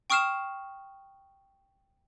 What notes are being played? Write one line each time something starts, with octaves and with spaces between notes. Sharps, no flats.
G5 C#6 D#6 F6 C7 E7